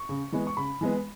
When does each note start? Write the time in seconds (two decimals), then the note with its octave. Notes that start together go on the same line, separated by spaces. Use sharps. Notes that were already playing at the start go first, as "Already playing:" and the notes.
Already playing: C#6
0.09 C#3
0.32 E3 G#3 B3
0.47 C#6
0.57 C#3 B5
0.81 E3 G#3 B3